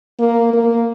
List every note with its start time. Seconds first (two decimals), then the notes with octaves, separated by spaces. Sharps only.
0.20 A#3
0.54 A#3